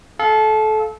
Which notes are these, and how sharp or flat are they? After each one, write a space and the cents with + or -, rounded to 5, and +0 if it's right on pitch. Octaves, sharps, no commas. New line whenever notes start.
A4 -25 F5 +0